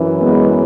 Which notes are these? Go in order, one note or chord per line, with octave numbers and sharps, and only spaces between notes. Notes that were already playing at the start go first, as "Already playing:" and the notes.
Already playing: F#2 E3
G#3 B3